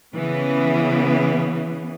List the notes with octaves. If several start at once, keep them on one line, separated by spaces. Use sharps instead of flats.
C#3 E3 B3